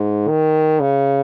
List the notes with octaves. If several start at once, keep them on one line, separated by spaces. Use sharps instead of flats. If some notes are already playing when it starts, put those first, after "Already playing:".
Already playing: G#2
D#3
C#3